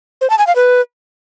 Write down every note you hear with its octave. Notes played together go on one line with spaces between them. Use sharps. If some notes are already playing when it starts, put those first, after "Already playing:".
C5
A5
G#5
F5
B4